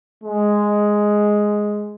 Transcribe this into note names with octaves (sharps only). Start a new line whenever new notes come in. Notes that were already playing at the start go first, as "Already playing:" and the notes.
G#3